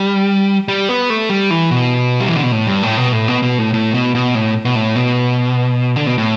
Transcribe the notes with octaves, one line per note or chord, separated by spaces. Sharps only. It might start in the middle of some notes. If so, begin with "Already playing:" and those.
Already playing: G3
G3
B3
A3
G3
E3
B2
G3
E3
D3
B2
A2
G2
A2
B2
A2
B2
B2
A2
A2
B2
B2
A2
B2
A2
B2
D3
B2
A2